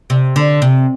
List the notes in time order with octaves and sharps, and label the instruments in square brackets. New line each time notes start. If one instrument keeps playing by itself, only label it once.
[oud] C3
D3
C3